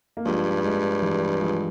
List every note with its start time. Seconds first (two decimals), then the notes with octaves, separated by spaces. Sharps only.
0.17 A#3
0.25 G2 F3 G#3
0.64 F3 G#3
1.02 E3 G3
1.41 F3 G#3